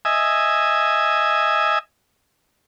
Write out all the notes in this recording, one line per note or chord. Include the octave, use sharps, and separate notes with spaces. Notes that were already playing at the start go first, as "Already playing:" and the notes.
D#5 E5 G#5